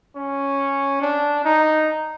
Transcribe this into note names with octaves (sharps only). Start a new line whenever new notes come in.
C#4
D4
D#4